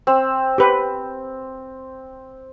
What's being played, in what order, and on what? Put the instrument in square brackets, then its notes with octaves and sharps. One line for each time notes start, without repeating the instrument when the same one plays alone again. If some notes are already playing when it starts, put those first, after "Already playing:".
[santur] C4
[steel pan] G4 B4